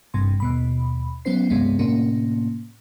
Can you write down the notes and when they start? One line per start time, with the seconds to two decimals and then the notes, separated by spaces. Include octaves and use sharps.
0.14 G#1 G2 C3 C6
0.40 D#2 B2 B5
1.25 F#3 B3 C#4 C5 C7
1.50 C#2 G2 C3 G#3 B3
1.79 A2 C3 A#3 C#4